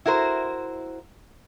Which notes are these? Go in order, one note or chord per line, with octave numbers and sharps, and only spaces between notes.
E4 F#4 A#4 C5